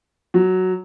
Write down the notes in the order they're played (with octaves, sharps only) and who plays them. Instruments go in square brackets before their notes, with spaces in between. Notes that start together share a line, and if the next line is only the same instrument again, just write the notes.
[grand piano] F#3